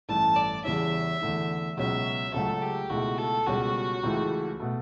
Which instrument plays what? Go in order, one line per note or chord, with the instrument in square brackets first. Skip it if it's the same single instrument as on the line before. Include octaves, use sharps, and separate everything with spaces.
[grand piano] A1 G2 E3 A3 [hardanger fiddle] A5
[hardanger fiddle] D5
[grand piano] E2 C#3 G3 C#4 E4 [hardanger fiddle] E5
[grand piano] E2 D3 A3 E4
[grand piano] C#2 B2 F#3 C#4 [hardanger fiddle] E5
[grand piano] C#2 C#3 F#3 A3 [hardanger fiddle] A4
[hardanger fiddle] G4
[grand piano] C#2 B2 A3 E4 [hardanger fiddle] F#4
[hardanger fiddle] A4
[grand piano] C#2 B2 G3 C#4 [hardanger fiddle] F#4
[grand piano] C#2 C#3 E3 A3 E4
B2 A3